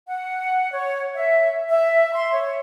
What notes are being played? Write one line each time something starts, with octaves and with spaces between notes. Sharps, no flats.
F#5
C#5
E5
E5
C6
C#5